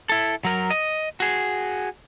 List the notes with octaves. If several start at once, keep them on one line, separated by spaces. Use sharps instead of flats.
E4 A4
F#3 A#4
D#5
F#4 G#4